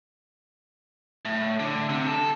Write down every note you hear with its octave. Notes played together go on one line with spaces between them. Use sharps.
A2
D3
C3
A4